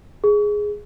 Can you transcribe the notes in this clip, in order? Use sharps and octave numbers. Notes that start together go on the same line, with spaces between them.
G#4